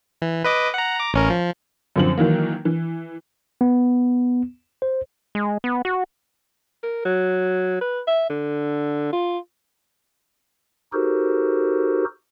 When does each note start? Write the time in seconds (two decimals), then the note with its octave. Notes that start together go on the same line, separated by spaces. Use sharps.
0.22 E3
0.45 B4 D#5 D6
0.74 F#5 A#5
0.97 A#5 D6
1.14 A1 C#4 A#4
1.30 F3
1.96 F#2 D3 F3 C4 F#7
2.18 D#3 E3 F#3 A#3
2.65 E3
3.61 B3
4.82 C5
5.35 G#3
5.64 B3
5.85 F#4
6.83 A#4
7.05 F#3
7.81 B4
8.07 E5
8.30 D3
9.12 F4
10.93 D#4 F#4 G4 A4 A#4 C5